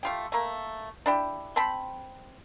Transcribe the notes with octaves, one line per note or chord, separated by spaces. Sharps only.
A3 F4 G4
A3 A#3
D4 E4 G4
C4 G5 A5 B5